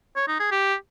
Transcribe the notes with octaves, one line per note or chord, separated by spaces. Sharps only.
C#5
D#4
G#4
G4